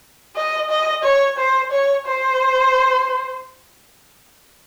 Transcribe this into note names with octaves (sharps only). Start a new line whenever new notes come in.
D#5
D#5
C#5
C5
C#5
C5